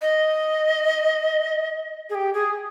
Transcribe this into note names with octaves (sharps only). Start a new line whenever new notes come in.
D#5
G#4
G4
G#4